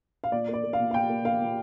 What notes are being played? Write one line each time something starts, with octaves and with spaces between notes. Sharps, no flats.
F5
A#2 D5
A#3
D5
A#3
F5
A#2
F5
A#2 G5
A#3
A#3 F5
A#2